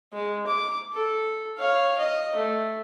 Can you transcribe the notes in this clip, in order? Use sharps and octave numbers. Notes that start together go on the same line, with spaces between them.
G#3
D6
A4
C#5 F5
D#5
A3